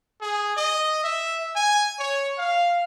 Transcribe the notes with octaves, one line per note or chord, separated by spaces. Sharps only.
G#4
D#5
E5
G#5
C#5
F5